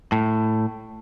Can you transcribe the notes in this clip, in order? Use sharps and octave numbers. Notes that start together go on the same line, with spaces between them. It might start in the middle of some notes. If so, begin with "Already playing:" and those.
A2